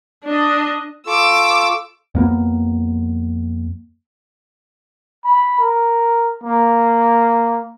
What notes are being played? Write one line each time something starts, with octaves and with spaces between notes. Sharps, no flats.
D4 D#5
F4 A4 C#6 D6 E6
F2 A#3 B3
B5
A#4
A#3